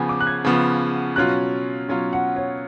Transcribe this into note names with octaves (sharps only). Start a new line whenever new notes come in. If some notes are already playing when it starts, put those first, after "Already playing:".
Already playing: C#3 F3 B3 F#5 G#5
D6
F#6
G#6
C#3 F3 B3
B2 F#3 C#4 F4 F#6
B2 F#3 C#4 F4
F#5
C#5